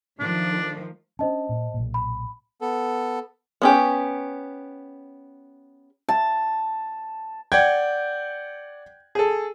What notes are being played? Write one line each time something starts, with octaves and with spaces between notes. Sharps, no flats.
D#3 F3 A3 D4
C#4 D4 C5 D#5 A5
A#2
B1 A#2
B5
B3 A4
B3 C#4 G4
A5
D5 F#5 G5 G#6
G#4 A4